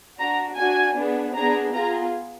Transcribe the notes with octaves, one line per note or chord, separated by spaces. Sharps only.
D4 F#4 A#5
D4 F#4 G#5
B3 D4 G#4
B3 D4 G#4 A#5
B3 F4 G#4 A#5